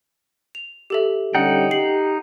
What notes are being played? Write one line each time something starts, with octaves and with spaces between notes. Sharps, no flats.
F7
G4 A4 E5
D3 G3 C#4 D#4 F#5 G5
G4 C7 F#7